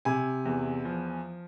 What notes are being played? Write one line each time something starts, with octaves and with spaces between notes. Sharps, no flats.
C3 G#5
E2
F3